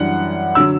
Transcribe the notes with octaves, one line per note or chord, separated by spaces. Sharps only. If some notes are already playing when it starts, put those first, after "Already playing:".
Already playing: F#2 E3 G3 D4 F#5
D3 F#3 E6